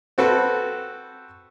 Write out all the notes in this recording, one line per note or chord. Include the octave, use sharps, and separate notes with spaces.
C4 F#4 A4 B4